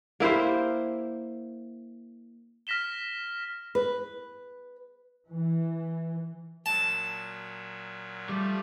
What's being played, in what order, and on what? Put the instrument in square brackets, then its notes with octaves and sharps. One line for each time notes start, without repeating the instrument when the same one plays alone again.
[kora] A#3 E4 G4 C5
[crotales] F6 A#6 B6 E7 G7
[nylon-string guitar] B4
[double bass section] E3
[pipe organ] A#2 F#3 [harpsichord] A5
[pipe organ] F3 A3 [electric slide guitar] G3